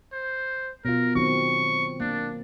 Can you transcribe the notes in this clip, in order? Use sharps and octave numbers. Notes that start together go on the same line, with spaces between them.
C5
B2 F4 A#4
D#3 F#3 C4 C#6
A#3 D4